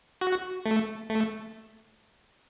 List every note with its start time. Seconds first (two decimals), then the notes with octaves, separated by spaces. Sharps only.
0.21 F#4
0.66 A3
1.10 A3